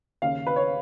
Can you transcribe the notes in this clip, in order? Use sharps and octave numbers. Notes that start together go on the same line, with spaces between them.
D#2 C#3 F5
B4
C#5